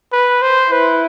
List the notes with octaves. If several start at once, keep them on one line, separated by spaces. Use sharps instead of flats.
B4
C5
E4 B4